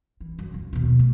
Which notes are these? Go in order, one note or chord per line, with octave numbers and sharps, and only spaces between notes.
E3
F#2
D1
D#2 B2
A3